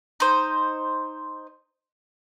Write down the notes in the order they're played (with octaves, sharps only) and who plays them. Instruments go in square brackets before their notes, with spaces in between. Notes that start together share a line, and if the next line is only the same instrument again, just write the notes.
[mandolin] D#4 C5